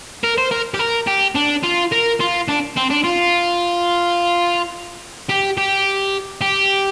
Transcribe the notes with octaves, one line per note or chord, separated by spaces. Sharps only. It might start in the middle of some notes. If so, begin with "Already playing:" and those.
A#4
C5
A#4
G4
A#4
G4
D4
F4
A#4
F4
D4
C4
D4
F4
G4
G4
G4